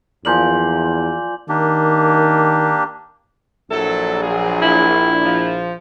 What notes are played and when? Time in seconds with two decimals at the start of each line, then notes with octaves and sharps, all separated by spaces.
0.25 E2 F3 A#3 D5 G#5 G6 F#7
1.49 D#3 A#3 D4 G4
3.71 A#1 F#3 E4 A4
4.22 F#3 F4 G#4
4.63 E4
5.25 F3